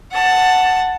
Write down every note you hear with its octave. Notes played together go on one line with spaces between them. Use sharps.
F#5 A5